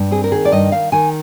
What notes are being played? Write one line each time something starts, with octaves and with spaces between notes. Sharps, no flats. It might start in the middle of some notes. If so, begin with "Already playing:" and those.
Already playing: G2
C4 G#4
A#4
D#3 G#4
D5
G2 D#5
D#3 F5
D#3 G#5